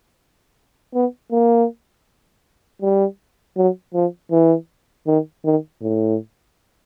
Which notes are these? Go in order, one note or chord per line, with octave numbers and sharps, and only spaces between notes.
B3
A#3
G3
F#3
F3
E3
D#3
D#3
A2